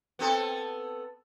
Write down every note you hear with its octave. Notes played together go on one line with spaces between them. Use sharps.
B3 C4 A4